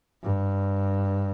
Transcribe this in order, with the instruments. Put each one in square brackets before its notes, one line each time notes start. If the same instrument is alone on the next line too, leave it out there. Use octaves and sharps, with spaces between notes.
[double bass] G2